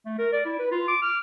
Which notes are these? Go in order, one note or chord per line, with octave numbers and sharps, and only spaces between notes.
A3
A#4
D5
E4
B4
F4
D6
F6